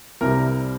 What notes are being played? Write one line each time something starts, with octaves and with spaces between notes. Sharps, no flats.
C2 C3 G3 A#4